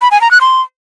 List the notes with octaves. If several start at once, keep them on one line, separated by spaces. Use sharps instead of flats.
B5
G#5
A#5
F#6
C6